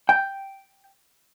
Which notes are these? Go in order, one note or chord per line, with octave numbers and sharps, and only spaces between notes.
G5